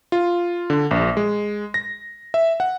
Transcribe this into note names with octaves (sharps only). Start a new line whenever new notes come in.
F4
D3
A#1
G#3
A#6
E5
F#5